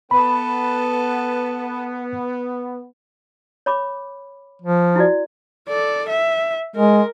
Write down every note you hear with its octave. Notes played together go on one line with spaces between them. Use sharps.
B3 A4 B4 B5
C#5 B5 D6
F3
E4 F#4 D5
A4 D5
E5
G#3 A#4